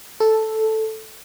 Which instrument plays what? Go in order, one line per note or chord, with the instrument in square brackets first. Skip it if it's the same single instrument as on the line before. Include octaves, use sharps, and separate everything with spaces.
[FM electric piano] A4